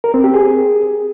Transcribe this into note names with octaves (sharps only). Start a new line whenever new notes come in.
A#4
C4
G4
G#4